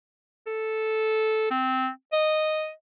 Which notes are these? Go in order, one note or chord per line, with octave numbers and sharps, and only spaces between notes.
A4
C4
D#5